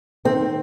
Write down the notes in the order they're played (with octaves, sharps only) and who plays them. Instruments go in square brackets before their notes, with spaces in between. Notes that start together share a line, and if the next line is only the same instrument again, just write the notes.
[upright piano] D#3 [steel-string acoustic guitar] C4